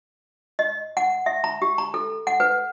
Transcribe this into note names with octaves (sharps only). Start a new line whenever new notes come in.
D#5
F#5
E5
A#5
G4
A#5
A4
F#5
B4